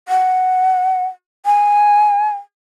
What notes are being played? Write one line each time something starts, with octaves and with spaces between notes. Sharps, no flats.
F#5
G#5